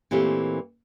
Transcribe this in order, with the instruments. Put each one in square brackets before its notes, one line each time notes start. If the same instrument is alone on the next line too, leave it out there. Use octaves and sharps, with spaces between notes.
[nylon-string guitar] A#2 E3 A3 A#3 C4 G4